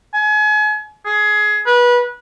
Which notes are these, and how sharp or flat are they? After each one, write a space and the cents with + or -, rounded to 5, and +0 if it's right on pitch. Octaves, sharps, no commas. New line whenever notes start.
G#5 +35
G#4 +20
B4 -25